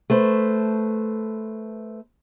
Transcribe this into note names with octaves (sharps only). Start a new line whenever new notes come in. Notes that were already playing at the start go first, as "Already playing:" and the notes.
A3 B4 C5